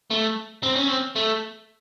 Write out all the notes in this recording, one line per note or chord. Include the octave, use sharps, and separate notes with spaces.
A3
C4
C#4
C4
A3